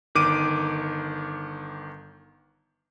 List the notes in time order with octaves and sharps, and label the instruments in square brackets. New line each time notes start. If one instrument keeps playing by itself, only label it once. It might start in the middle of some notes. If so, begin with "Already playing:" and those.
[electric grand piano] G1 D#3 D6 D7 D#7